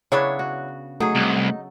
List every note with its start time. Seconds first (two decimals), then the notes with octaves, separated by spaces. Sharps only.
0.12 C#3 F#3 B3 D4 E4 C#5
0.39 F#4
1.00 F#3 A3 D#4 G#4
1.15 C2 A4